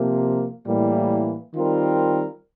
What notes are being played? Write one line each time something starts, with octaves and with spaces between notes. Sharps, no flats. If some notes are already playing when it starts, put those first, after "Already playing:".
Already playing: C3 F3 A#3
A2 E3 G3 A#3
D#3 G3 C4 F4 A#4